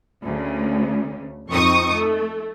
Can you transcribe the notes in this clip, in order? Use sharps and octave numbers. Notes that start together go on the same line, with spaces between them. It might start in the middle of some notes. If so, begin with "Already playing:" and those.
D2 C#3
F2 C4 D#4 C#6 D#6
A3